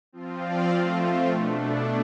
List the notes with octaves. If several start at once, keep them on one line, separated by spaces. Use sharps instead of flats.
F3 C4 F4
D5 F5
F3 A3 C4 F4
B2 A3 D4